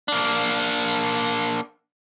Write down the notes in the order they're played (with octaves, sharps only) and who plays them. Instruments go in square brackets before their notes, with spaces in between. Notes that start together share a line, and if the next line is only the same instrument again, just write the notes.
[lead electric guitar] A#3 D4